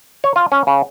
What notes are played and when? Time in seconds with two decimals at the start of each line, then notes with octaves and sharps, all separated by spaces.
0.24 C#5
0.36 F4
0.52 C#4
0.67 C#3